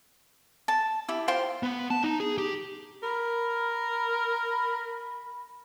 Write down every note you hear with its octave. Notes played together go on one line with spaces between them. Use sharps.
A5
E4 G4
F4 C5 G5 C6
B3
A5
D#4
G#4
G4
A#4 B5